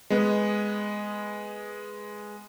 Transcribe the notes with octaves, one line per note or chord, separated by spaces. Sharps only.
G#3 B3